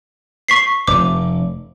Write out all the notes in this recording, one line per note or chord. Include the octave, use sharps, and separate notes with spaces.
C#6 B6 C7
F1 D6